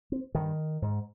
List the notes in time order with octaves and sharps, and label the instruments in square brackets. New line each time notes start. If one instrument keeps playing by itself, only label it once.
[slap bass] C4
G2 D#3
G#2